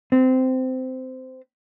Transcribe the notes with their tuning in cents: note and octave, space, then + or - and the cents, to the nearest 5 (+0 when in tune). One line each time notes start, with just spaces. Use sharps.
C4 -15